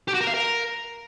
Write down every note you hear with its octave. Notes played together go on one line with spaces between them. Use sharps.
G4
F#4
A#4
F5
A#4